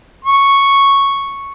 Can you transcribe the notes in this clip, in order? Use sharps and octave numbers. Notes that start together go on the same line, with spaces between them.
C#6